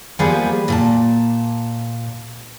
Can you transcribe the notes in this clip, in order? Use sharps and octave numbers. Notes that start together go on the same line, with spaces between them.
F3 G3 A#3 B3 G#4 B4
A#2 A#4 A5